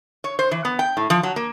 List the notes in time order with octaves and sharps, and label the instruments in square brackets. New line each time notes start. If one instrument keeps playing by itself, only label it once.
[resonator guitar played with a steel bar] C#5
C5
E3
B3
G5
A2
F3
F#3
A#3